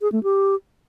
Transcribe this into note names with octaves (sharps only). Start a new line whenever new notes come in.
G#4
A3
G4